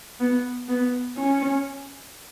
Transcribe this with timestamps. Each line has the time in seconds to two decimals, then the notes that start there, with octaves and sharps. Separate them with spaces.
0.20 B3
0.69 B3
1.17 C#4